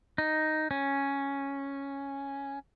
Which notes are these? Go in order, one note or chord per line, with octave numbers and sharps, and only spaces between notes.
D#4
C#4